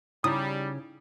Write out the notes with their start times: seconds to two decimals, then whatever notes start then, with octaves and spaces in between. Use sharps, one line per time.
0.24 C#3 G3 D#4 E4 B5 D#6